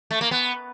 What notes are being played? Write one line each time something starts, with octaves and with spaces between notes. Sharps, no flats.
A3
A#3
B3